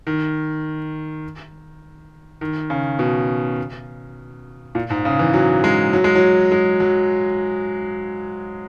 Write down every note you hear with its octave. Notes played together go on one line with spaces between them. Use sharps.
D#3
D#3
C#3
B2
A#2
G#2
C#3
E3
F#3
G#3
F#3
G#3
F#3
G#3
F#3